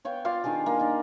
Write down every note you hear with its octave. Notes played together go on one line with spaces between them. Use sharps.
B3 C#5 F5 G5
F4 D5 F5
D#3 D4 G4 G#4
A#3
D#4 D5